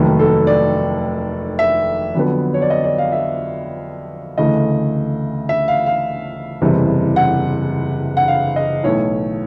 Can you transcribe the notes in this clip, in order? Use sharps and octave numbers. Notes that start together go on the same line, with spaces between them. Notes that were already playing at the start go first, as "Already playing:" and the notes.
Already playing: F1 D#2 D#3 F#3 A3
A4
D5
E5
F2 D3 F#3 B3
C#5
D5
D#5
D5
F5
E5
D2 C#3 E3 A3 D#5
E5
F5
F5
F#1 E2 C3 E3 G3
F#5
F#5
F5
D#5
B1 A2 E3 A3 C#5